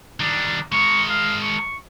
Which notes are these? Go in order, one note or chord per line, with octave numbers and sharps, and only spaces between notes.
D#3 G3 D4
G#3 A#4 C#6
F5
C#6